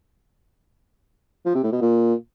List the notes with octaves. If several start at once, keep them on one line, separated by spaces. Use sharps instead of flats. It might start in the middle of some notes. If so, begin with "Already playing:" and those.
F3
C3
A2
B2
A#2